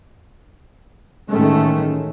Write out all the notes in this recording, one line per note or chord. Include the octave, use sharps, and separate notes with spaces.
A1 G#2 D#3 G#3 A3 C#4